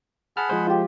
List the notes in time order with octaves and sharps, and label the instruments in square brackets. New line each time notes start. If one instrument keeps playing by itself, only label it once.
[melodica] G#4 F#5 B5 [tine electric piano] A5 F6
[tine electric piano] F3 G#3 C5
[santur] F4 G4